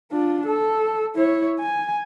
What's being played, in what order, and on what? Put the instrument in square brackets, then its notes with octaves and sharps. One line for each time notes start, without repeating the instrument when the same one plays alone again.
[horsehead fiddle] D4 F4
A4
E4 C#5
G#5